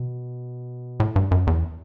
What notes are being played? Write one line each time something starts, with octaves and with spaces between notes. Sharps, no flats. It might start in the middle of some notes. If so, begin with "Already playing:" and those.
Already playing: B2
A2
G2
F#2
E2